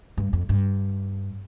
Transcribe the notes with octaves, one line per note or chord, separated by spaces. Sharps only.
G2
F2
G2